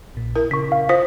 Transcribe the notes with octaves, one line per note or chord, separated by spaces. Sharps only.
A#1 A#2
E4 A#4
C#3 C#6 B6
F5
F4 C5 D#6 B6